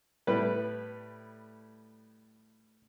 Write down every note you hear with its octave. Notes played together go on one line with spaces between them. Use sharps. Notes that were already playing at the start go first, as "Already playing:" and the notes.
A2 G3 B4